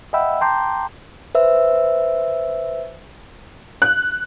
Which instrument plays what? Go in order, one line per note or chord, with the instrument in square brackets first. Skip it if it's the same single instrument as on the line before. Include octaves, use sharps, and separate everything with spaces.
[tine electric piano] D#5 E5 F#5 G5 B5 E6
G5 A5 A#5 C6 D6 G6
[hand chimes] B4 C5 E5 E6
[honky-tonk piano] F#6